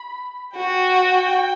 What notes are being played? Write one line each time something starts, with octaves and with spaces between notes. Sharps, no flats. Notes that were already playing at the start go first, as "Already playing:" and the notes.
Already playing: B5
F#4 G5